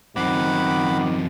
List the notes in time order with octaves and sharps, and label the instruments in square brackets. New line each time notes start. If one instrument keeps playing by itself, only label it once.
[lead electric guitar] F#2 C4 [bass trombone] D#3 [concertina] F#5 B5 D6